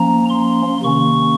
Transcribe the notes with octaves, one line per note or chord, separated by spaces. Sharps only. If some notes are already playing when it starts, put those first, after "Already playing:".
Already playing: F3 A#3 C#4 A#5
C6
C3 D#3 A#3 C#4 C#6